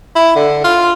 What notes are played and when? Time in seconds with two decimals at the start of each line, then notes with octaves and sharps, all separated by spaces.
0.15 E4
0.36 D3
0.64 F4